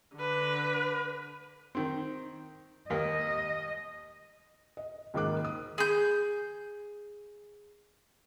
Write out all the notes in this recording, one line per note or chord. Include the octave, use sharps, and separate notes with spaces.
D3 B4
D#3 C4
D#2 A#3 D#5
D#5
C#2 G#2 D#3 A#3 D6 F#6
D#6
G#4 G6